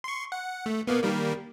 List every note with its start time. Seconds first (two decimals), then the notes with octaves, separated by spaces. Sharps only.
0.04 C6 C#6
0.32 F#5
0.66 A3
0.87 B2 A#3 B3
1.03 D#3 G3 A#3